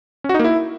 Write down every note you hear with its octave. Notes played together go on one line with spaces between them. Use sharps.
C#4
F#4
D#4
A#3
E4